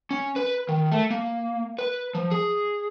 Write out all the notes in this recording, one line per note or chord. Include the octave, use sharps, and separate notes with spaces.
C#4
B4
D#3
A3
A#3
B4
F3
G#4